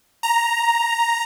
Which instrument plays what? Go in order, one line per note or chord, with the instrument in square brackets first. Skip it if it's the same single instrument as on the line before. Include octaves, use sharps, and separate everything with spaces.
[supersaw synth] A#5